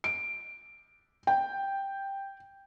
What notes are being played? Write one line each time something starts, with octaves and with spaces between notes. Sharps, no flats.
D7
G5